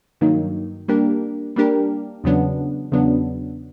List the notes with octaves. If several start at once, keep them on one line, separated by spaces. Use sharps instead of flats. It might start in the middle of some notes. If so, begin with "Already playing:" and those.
G2 D#3 F#3 A#3 D#4
G3 A#3 D4 G4 A#4
G3 A#3 D4 G4 A#4
E2 C#3 F#3 B3 D4
E2 C#3 F#3 B3 D4